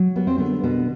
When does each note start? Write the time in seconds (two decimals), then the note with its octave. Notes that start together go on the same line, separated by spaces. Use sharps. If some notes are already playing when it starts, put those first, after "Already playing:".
Already playing: F#3
0.16 G3 B3
0.27 C4
0.38 D3 B3
0.63 B2 B3